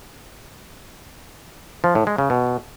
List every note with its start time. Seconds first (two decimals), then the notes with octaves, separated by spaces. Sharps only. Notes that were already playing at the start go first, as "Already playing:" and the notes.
1.84 F3
1.95 A2
2.07 G#3
2.18 C#3
2.30 B2